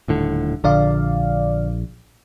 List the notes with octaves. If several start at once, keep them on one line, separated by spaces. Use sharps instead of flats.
D#1 A2 D3
A#1 D3 D5 F5